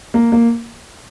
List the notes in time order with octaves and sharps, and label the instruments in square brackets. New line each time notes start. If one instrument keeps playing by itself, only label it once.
[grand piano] A#3
A#3